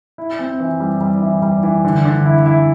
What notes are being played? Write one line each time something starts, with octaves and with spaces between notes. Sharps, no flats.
E4
C4
E3
G3
G3
E3
G3
E3
D3
D3
E4
E4